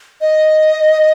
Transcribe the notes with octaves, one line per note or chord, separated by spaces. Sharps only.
D#5